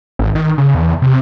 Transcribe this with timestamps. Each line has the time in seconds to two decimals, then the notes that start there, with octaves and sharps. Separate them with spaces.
0.19 G#1
0.35 D#3
0.58 C#3
0.75 E2
1.02 C3